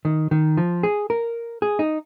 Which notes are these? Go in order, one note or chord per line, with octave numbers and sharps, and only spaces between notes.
D#3
D#3
F3
G#4
A#4
G#4
D#4